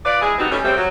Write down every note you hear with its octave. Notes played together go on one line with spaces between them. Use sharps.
F4 B4 D5
G#3 E4 G#4
G3 B3 C4 D#4 F#4
G3 A3 C#4
C#3 G3 A3 C4
F#3